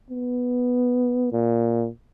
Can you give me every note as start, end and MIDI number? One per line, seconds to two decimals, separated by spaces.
0.10 1.30 59
1.32 1.88 46